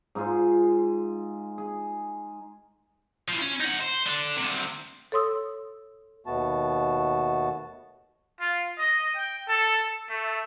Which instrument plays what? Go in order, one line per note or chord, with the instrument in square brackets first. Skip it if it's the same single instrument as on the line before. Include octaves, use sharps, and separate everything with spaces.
[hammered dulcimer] G#2 D#4 F4 G#4
G#4
[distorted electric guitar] E3 F3
C#4
D#4 F#5
C5
D3 D4
D2 C3
[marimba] A4 C#5 C6 D#6 E6
[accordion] D#2 B2 A3 B3 F#4 A5
[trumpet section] F4
D#5
G5
A4
A3